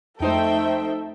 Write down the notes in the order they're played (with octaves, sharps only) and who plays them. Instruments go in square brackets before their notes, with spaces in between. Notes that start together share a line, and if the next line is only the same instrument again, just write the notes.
[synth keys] F2 D#4 C5 [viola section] A3 G5 [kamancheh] A4 E5